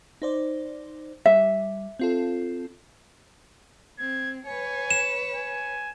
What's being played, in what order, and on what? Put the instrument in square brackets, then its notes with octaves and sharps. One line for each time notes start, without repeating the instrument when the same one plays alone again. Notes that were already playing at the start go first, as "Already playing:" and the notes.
[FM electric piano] D#4 C5 D5
[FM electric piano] G3 [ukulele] E5
[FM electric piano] C4 F4 A4
[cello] C4 [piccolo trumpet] G#6
[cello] B4 C#5 [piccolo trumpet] G#5
[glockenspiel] E7
[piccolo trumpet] G#5